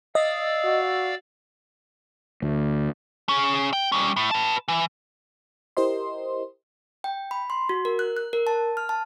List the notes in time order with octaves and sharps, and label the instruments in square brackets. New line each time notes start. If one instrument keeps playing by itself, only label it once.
[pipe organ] D5 F5 E6 [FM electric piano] D#5
[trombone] F#4
[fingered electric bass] D2
[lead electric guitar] C#4 G#4
G5
G3 C#4
A2
B4 A5
E3
[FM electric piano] E4 G4 A#4 C5 D#5 C6
[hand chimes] G5
B5
C6
F#4
A#4
F#6
F#6
A#4
A5
F6
A5